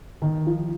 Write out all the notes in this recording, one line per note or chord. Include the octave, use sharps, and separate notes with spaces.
D#3
F3